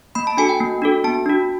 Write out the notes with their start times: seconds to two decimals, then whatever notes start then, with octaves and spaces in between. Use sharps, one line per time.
0.15 A#3 B5
0.27 A5
0.37 D4 F#4 A4 G#5
0.49 G5
0.60 A#3
0.82 D4 F#4 A4
1.04 B3 A5
1.26 D4 F#4